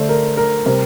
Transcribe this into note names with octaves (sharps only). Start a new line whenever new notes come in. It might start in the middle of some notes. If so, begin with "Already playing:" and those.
Already playing: D3 A3 D4 C5
A#4
A#4
C3 G3 C4 A#4